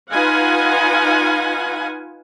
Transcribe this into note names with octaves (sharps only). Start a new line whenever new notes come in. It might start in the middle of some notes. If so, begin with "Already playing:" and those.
D#4 F4 B4 F5 F#5 G#5